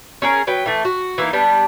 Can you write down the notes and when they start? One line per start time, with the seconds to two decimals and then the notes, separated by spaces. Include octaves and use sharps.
0.22 C#4 G#4 A#4
0.47 F#3 B4 G5
0.66 E3 A3
0.85 F#4
1.18 E3 A#3 D#4
1.33 G3 B3 D4